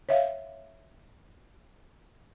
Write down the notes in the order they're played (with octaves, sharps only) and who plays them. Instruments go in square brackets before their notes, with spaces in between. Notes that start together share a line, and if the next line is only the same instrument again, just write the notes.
[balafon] C#5 E5 F5